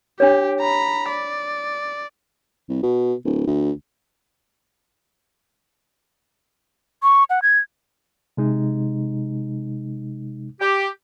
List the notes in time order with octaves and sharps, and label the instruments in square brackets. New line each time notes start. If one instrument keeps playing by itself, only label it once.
[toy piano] D4 C#5 [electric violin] G4
[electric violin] A#5 B5
D5
[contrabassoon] C2
B2
D1
D2
[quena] C#6
F#5
G#6
[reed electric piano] C3 G#3 D#4
[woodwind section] G4